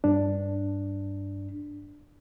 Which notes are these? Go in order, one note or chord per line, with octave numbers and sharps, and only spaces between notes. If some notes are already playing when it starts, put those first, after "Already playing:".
G2 D4